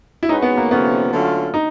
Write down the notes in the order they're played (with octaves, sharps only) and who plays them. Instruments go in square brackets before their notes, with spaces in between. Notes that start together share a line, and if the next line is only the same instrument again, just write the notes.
[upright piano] E4
[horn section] G#3 C#4 F#4 B4 [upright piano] D#4
[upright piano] B3
A#3
[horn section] C3 F3 A3 C#4 [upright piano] B3
[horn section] D3 F#3 A3 C#4 F4
[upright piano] D#4